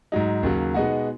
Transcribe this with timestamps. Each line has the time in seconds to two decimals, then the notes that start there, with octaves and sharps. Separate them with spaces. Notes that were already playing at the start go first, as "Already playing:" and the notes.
0.12 G#2 F#3 D#4
0.43 D#2 C#3 F#3
0.74 B2 G#3 B3 D#4 F#4